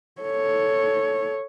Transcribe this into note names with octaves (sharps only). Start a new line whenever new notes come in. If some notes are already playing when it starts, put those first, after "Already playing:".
A4 C#5